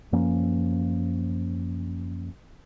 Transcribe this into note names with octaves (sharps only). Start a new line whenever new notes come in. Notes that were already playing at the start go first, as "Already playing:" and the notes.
F#2 F3 A#3 C#4